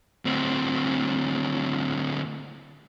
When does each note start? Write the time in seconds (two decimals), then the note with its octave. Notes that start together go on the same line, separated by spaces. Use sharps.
0.25 D2 C4